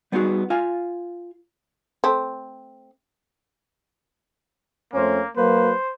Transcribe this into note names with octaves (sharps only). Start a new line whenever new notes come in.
G3 B3 D#4 F4 F#4 G#4
F4 F5 G#5
A3 C4
F2 A3 A#3 C#4 C5
F#3 A#3 B4 C5